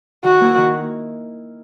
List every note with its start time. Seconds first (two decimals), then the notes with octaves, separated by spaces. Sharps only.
0.24 D#3 F#4
0.41 A#3 E4
0.57 D#3